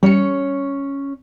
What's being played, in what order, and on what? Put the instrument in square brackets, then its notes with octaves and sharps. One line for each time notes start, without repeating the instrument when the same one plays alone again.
[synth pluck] G3 C#7 [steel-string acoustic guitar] C#4 C#5